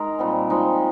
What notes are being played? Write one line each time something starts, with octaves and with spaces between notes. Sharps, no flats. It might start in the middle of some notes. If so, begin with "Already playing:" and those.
Already playing: G#3 D#4 A#4
A#2 G3 C4
F3 G#3 D#4